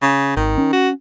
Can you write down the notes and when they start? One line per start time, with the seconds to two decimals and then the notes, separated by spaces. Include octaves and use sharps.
0.02 C#3
0.37 G#1 D#3
0.58 C#4
0.73 F#4